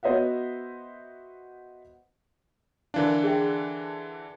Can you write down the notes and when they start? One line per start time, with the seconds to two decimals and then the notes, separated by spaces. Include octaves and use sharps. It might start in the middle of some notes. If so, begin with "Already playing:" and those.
0.03 B3 F#4 C5 D#5 E5 F#5
2.94 D3 E3 D4 A#4 F5
3.24 G#4 E5 G5